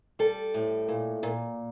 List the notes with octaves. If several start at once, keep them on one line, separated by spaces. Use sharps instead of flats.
G3 A4
A2
A#2
A#2